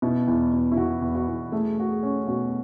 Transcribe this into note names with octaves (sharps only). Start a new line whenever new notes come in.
B2 E4
E2
B2
E4
E2 F#4
E2
F#4
E2
A3 G#4
A3 F#4
G#4
C#4
B2 F#4